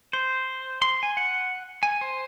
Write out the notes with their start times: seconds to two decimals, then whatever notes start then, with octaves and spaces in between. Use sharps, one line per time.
0.13 C5
0.82 C6
1.03 G#5
1.17 F#5
1.83 G#5
2.01 C5